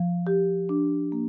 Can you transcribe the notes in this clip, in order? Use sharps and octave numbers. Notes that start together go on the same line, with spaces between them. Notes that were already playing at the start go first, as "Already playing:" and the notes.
Already playing: F3
G4
D4
A#3